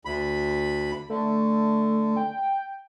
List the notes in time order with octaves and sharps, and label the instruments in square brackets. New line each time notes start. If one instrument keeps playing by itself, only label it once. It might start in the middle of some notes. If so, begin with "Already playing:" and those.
[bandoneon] D2 B5
[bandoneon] D3 [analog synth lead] A3
[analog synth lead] G5